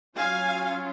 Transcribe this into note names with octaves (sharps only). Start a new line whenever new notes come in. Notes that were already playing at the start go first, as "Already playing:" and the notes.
F#3 C#4 F4 F5 G#5